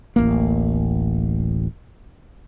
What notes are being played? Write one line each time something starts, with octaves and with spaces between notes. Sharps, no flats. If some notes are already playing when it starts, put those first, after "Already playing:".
D1 A1 A#3